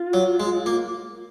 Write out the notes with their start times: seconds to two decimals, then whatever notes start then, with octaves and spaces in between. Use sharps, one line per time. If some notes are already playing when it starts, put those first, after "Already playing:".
Already playing: F4
0.13 F#3
0.40 G#3
0.66 A#3